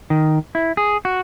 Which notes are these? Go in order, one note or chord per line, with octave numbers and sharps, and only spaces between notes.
D#3
E4
G#4
F#4